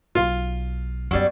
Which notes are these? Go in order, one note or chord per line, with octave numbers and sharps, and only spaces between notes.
B1 F4
F#2 F#3 G3 B3 D5